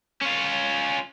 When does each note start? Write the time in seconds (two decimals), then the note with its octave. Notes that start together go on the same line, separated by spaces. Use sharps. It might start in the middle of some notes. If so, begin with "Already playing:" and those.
0.21 C#4 F4